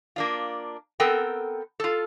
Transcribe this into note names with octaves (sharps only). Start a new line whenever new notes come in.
A#3 D4 F4
B3 C4 A4 A#4 G5
F4 A4